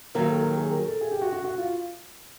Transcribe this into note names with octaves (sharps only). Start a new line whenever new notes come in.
D#2 D#3 F#3 A#4
A4
A#4
G#4
A#4
A4
G#4
G4
F#4
F#4
F#4
F4